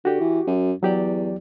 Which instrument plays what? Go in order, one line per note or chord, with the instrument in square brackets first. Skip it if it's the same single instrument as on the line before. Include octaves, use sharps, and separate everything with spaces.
[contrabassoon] D3 [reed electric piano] F#4 G4
[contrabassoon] E3
F#2
[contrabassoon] E2 [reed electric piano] F#3 G4 D5